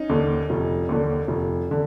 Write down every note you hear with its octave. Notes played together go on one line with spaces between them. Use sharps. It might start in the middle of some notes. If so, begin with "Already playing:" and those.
Already playing: C#4 D#4
D#2 D3
F1
D#2 D3
F1
D3